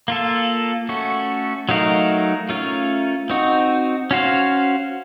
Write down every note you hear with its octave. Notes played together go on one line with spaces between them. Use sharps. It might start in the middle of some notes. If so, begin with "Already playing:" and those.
A#3 F4 A4
A3 C#4 F#4 A4
F#3 A3 D#4 A#4 F5
A3 C#4 F4 A#4 F5
C4 D#4 F#4
C#4 F#4 C5 F5